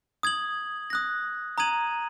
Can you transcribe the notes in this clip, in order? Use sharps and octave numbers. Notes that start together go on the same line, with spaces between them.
D#6 G#6 F#7
D#6 F#6 A#6
A#5 D#6 G#6 D#7 F#7